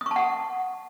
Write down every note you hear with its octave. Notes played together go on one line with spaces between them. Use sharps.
F#5 A5 C#6 D#6